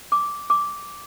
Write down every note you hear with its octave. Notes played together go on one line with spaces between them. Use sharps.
D6
D6